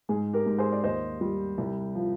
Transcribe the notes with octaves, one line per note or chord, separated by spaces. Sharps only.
G#2 G#4
G4 A#4
G#2
G#4 C5
D5
D#2 C5 D#5
G3
C2
F3